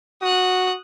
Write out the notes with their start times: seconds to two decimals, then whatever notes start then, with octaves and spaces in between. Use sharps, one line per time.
0.23 F#4 D#6 F#6